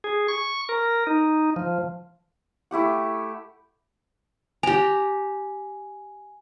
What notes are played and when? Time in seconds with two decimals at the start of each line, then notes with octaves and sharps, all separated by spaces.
0.04 G#4
0.28 C#6
0.69 A#4
1.07 D#4
1.56 F3
2.71 A3 E4 G4 F#5
4.63 G4 G#5 A#5